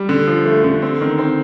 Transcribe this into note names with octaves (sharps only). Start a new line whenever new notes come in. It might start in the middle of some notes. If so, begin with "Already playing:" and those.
Already playing: G3
D3
F3
A3
D3
C4
D#3
C4